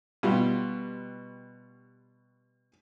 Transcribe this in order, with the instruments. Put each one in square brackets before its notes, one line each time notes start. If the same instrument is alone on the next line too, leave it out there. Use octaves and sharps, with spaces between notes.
[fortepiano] B2 G3 F4 G4